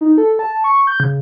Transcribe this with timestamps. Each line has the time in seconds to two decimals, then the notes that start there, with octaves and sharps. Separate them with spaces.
0.01 D#4
0.18 A4
0.39 A5
0.64 C#6
0.87 G6
1.00 C#3